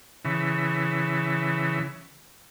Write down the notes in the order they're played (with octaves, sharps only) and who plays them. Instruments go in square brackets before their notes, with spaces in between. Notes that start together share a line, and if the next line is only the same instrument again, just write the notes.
[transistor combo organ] C#3 E3